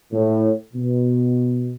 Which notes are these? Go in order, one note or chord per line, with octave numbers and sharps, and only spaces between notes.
A2
B2